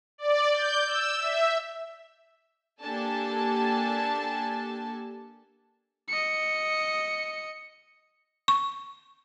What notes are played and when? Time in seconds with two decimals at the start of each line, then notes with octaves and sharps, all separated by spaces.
0.18 D5
0.52 G6
0.86 E6
1.18 E5
2.82 A#3 D4 G4 A4 G#5 A5
6.09 D#5 C#7
8.48 C#6